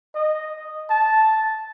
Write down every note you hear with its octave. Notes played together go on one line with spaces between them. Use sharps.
D#5
A5